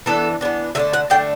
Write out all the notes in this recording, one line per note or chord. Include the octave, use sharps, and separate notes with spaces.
E3 B3 D4 A4
E3 B3 D4
D3 A3 D4 E5
F#5
D3 A3 D4 G5